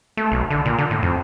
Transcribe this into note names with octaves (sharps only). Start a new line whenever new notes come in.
A3
B1
D3
A#2
D3
A2
F2